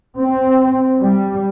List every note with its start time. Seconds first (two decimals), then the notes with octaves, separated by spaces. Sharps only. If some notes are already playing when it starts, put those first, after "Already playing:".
0.18 C4
1.00 G3